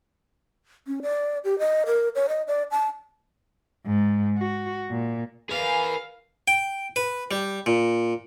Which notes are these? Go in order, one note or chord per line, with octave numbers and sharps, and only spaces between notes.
C#4
D5
G4
D#5
A#4
C#5
D#5
D5
A5
G#2
F#4
A#2
G#4 A#4 B4 F5 G#5
G5
B4
G3
A#2